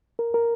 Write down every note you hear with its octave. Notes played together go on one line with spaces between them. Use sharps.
A#4
A#4